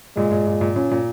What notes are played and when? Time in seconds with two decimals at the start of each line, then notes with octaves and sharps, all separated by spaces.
0.17 A#2 G#3
0.31 A#2
0.47 A#2
0.61 A#2
0.76 A#2 C#4
0.91 A#2